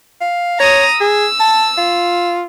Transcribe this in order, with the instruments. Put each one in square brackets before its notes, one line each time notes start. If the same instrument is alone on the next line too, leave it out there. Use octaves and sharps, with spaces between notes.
[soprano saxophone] F5
[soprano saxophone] C#5 [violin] A#5 D#6
[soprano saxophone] G#4 [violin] E6
[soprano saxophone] A5
F4